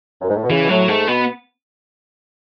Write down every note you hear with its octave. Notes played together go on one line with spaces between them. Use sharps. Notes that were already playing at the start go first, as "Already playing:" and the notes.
F#2
G#2
A2
B2
C#3 E3
B2
A2 F#3
G#2 A3
B2 B3